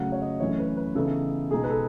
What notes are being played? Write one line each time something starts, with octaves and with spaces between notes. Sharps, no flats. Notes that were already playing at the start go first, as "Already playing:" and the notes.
Already playing: C#3 F#3 A3 F#5
C#5
D#5
F#2 E3 A3 C#4 C#5
B4
B4
C#3 E3 B3 D#4 A4
B2 G#3 D#4 G#4
B4
A4